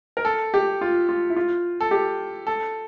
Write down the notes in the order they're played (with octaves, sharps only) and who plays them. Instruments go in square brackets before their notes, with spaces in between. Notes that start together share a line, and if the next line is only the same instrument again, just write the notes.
[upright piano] A#4
A4
G4
F4
F4
E4
F4
A4
G4
A4